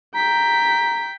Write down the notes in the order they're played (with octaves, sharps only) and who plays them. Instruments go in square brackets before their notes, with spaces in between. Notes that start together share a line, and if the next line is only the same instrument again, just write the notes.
[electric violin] G5 B6 [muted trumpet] A#5